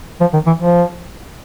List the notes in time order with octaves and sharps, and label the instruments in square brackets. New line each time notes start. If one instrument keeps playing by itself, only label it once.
[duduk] F3
D#3
E3
F3